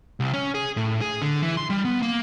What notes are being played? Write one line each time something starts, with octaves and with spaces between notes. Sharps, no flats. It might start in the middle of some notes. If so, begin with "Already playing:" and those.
C2
C#4
G#4
A2
G#4
D3
E3
C6
G3
B3
A#3